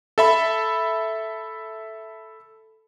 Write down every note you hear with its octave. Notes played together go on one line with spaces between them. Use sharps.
A4 E5 B5